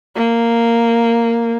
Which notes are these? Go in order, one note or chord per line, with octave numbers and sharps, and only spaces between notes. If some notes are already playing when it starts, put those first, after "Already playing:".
A#3